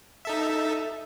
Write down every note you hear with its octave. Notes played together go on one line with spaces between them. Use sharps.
D#4 A4 E5